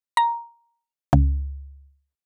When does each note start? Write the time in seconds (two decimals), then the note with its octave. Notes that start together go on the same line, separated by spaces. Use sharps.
0.17 A#5
1.13 C#2